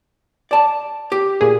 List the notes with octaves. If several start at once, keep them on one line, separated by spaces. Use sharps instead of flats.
D5 A5
G4
A#2 G#4